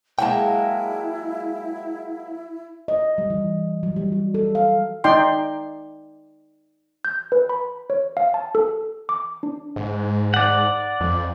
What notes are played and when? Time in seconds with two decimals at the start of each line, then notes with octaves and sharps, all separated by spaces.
0.19 F#3 G#3 A#3 E4 G5 A5
2.88 D#5
3.18 G3
3.30 E3
3.83 F#3
3.96 G3
4.12 F#4
4.34 A4
4.55 F5
5.04 D#4 D5 G5 C6
7.05 G6
7.32 B4
7.49 B5
7.90 C#5
8.17 F5
8.34 A5
8.55 A4
9.09 D6
9.43 D4
9.76 G#2
10.34 D5 F#5
11.01 F2